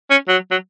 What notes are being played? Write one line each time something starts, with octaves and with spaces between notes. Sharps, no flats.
C#4
F#3
F#3